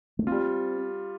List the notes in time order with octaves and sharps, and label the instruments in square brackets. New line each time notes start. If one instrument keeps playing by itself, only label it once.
[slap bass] A3
[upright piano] G3 F4 [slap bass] C4